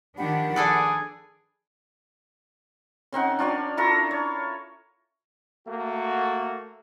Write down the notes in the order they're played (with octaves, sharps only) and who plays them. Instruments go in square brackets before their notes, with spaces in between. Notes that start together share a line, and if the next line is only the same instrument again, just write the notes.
[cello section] D#3 F3 D4 [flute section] G4 F#5 B5
[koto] D4 A4 B4 [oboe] G#4 [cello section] D5
[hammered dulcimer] C#3 C4 D#4 F#5
D4 F4 C#5 D5
E4 F4 A4 A#5
C#5
[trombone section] A3 A#3 F#4